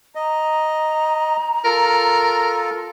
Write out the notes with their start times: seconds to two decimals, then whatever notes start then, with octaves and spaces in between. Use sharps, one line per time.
0.15 D#5 A#5
1.65 F4 A4 A#4